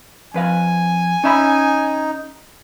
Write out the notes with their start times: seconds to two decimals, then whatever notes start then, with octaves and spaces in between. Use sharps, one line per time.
0.34 F2 B4 F5 G#5
1.24 C#4 D#4 E5 B5